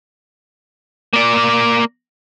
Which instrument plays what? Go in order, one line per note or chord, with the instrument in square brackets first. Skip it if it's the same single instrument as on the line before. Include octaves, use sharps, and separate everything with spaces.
[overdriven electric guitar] A#3 D5